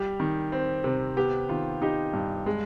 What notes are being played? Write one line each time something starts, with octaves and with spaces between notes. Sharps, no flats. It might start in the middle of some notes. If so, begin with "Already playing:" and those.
Already playing: G3 G4
D#3
C4
C3
B3 G4
D#3 F4
D#4 G4
G2
G#3